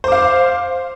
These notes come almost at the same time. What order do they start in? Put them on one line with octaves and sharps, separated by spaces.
C5 D6 F5